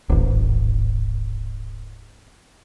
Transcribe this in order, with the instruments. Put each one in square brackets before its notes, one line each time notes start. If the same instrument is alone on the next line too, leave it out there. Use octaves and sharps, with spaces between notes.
[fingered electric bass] D1 G#1